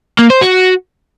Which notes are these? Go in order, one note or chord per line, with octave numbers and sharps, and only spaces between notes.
A#3
C5
F#4